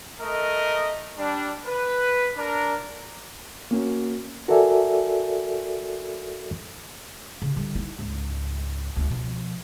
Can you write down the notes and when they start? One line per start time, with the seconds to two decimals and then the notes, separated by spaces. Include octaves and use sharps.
0.21 A3 A#4 D#5
1.18 G3 D4
1.67 B4
2.37 D4 A#4
3.71 A#3 C#4 F#4
4.48 F#4 A4 A#4 D5 E5 G#5
7.42 C#3
7.56 D3 G3
7.75 D#4 E4
7.99 C#2 G#2
8.96 C#2 D3
9.10 B2 F3